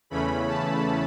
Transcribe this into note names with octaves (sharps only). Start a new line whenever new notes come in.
E2 C#3 E3 A3 C#4 B5
A5